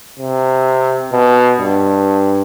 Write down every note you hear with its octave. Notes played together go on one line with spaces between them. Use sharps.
C3
B2
G2